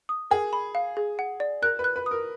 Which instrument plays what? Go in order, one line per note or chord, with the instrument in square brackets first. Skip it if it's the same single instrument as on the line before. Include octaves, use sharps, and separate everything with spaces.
[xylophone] D#6
[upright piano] G#4 [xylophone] A#4
[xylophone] B5
F5
G#4
F#5
D5
[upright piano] A#4 [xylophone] F#6
[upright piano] B4
[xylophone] F#6
[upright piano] B4
[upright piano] A#4 [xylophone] D#6